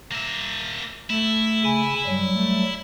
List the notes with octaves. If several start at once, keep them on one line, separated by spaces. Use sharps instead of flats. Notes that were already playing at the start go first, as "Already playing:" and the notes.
A#3 E5
A3 E4
C#3 G#5 B5
G2 F#3 G3
A3